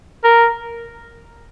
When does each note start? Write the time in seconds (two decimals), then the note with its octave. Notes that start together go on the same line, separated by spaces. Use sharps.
0.24 A#4